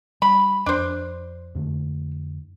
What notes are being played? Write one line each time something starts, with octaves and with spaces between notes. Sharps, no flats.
G3 B5
F2 D4 C5
F2 D3 A3